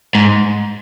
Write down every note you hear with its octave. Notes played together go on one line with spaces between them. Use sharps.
G#2